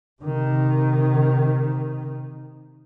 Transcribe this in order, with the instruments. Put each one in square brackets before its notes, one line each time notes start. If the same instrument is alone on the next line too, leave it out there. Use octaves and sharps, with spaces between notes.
[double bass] C3 D#3